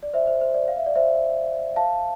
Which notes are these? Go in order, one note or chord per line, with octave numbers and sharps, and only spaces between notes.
D5
C5 E5
C5
C5
D5
F5
E5
D5
C5 E5
F5 A5